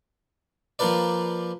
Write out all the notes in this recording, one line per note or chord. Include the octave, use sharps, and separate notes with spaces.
F3 A#3 F4 A#4 B4 D5